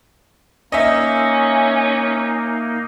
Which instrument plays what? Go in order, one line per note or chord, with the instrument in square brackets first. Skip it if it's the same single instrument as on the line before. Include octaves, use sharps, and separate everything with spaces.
[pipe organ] A#3 D#4 [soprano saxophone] C#4 [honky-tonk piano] D#5 E5